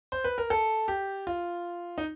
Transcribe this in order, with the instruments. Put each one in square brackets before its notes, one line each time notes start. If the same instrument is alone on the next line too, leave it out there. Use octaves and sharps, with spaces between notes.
[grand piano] C5
B4
A#4
A4
G4
F4
D#4